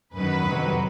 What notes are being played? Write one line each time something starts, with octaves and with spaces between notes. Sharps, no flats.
F#2 D#3 F#3 B4
F2 C3 D#3 F#3